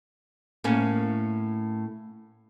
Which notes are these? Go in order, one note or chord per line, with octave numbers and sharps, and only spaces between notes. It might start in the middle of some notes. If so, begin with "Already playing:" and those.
A2 A#3 C#4